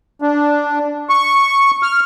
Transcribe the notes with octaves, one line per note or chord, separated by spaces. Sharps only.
D4
C#6
F6